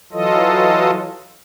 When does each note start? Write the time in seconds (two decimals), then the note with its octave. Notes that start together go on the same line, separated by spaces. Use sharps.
0.12 E3 F#3 F4 A4 D#5